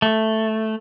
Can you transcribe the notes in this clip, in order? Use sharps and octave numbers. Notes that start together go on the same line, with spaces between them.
A3